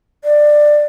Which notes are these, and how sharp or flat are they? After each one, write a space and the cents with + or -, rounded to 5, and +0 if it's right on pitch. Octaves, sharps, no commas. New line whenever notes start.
D5 +15